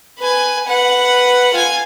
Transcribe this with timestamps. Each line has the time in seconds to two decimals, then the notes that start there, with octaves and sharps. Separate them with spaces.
0.19 B4 G#5
0.67 B4 F#5
1.54 F4 G#5